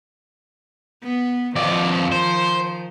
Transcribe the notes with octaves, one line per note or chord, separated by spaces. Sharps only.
B3
F2 D#3 F3 D5
C5